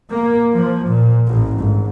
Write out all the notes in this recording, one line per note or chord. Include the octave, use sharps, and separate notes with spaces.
A#3
F3
A#2
A1
G#1